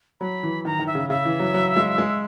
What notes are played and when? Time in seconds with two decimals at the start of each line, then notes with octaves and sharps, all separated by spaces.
0.21 F#3 B5
0.43 E3
0.65 D#3 A#5
0.79 D#3
0.87 E5
0.95 C#3
1.09 C#3 E5
1.25 E3
1.40 F#3
1.54 F#3
1.76 G#3
1.98 G#3